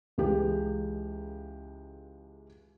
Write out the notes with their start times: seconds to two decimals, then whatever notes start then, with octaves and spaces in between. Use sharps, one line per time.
0.18 C#2 E3 G#3 G4